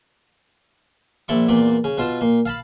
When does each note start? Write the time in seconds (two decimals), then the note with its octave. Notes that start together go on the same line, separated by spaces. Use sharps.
1.28 A#1 E4 D5 C6 C#6
1.48 E2 A#2 D5
1.84 C#3
1.97 B2 F4 A5
2.21 A#2
2.46 F5 A5 B5